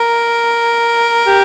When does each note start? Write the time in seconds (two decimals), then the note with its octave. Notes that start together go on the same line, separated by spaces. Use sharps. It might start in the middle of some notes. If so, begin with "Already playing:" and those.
Already playing: A#4
1.26 G4